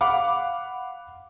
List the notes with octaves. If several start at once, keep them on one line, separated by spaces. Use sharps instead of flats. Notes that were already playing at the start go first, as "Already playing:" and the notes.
F5 F#5 B5 D6